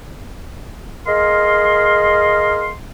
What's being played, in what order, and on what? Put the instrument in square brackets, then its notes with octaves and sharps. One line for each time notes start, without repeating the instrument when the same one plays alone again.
[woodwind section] G#4 A#4 D#5 F5 C6